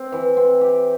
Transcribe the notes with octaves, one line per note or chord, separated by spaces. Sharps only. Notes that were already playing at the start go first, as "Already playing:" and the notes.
Already playing: C4
E3
C4
G4